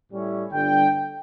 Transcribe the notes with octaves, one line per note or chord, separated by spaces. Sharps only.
A2 G3 C#4 E4
G1 G2 D3 G5